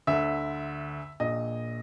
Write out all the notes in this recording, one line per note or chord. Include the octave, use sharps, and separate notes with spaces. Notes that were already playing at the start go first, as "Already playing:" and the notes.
D2 D3 E5
A#1 A#2 D#5